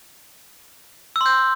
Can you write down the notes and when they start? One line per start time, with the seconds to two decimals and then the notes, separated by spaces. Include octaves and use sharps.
1.16 E6
1.21 C6
1.26 G6